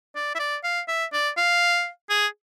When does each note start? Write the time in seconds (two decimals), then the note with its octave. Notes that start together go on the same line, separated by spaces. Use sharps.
0.15 D5
0.35 E5
0.39 D5
0.64 F5
0.88 E5
1.13 D5
1.37 F5
2.10 G#4